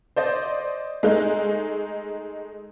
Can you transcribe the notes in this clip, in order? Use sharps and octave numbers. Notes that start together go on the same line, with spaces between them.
C5 D5 D#5
G#3 A3 D#4